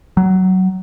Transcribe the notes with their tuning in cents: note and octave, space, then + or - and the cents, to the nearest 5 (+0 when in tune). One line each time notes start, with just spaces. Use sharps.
F#3 +15